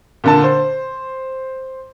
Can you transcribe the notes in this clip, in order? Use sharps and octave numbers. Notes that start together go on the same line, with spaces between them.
A#2 D3 A5
C5